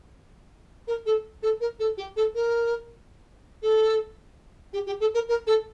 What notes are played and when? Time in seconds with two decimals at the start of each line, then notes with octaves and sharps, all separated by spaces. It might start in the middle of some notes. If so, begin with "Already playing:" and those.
0.87 A#4
1.06 A4
1.43 A4
1.61 A#4
1.79 A4
1.97 G4
2.16 A4
2.35 A#4
3.62 A4
4.73 G4
4.86 G4
5.00 A4
5.14 A#4
5.28 A#4
5.47 A4